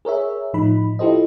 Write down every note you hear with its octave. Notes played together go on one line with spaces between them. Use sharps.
G#4 A#4 C#5 E5
A2 F3 D#4 B5
E4 F4 G4 A4 C5 D#5